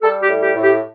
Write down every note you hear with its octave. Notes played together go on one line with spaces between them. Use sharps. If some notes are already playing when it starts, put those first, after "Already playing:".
G3 A4
G4
A2
G4
A2
G4